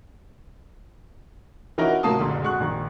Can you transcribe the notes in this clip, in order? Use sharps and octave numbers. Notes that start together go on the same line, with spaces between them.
E3 C#4 D#4 E4 F#4 A#4
A2 C3 F#3 A#3 A5 D#6
F#1 C2 A#2 D3
G#3 F#4 C#6 F#6
A#1 D#3